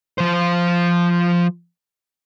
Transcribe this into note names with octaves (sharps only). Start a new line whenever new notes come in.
F3 C5